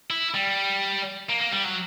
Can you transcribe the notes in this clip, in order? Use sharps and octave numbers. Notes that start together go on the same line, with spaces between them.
E4
G3
A#3
A#3
G3
F#3